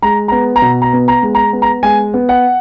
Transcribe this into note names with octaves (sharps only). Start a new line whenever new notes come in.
G#3 A#5
B3 A#5
A#5
B2
A#5
B3
A#5
G#3
A#5
B3
A#5
G#3 G#5
B3
F#5